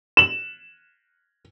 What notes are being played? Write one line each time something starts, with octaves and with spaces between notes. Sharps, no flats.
E7 F#7